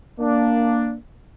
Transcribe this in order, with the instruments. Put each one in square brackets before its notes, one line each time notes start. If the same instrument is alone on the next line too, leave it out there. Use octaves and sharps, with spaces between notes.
[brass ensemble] A#3 D4